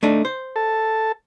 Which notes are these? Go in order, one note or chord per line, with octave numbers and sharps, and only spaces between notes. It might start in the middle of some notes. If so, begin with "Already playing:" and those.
A3 D4 D#4
C5
A4 A5